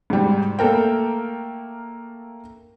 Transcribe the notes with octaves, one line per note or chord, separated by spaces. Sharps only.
G#2 G3
A3 A#3 A4 A#4 G5